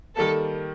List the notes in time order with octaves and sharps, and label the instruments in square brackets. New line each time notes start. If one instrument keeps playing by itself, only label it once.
[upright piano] D#3 G3 A#3 [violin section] A4